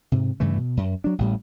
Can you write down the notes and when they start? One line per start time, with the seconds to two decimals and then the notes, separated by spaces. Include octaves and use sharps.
0.12 G#2 C3
0.40 G2 C#3 E3 A3
0.57 B2
0.77 F#2
1.04 F#3 D4
1.18 A1 A2 G3